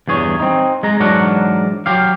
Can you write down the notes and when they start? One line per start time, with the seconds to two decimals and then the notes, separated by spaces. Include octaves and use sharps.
0.08 E2 G2 G#4 C#5
0.40 C4 D#4
0.83 G#3 A#5
1.00 G#2 E3 F#3 D4 A#4 F#5
1.86 F#3 G4 F5